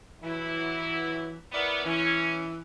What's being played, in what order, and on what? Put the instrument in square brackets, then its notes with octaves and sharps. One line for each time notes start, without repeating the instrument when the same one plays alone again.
[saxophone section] E3 [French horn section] F#3 E4
[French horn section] B3 [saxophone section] E4 A#4 D5
[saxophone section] E3 [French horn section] C#4